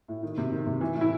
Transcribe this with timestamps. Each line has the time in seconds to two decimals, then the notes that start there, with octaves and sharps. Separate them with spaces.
0.08 A2
0.23 D#3
0.38 C3
0.52 D#3
0.66 C3
0.81 E3
0.96 A2
1.01 E4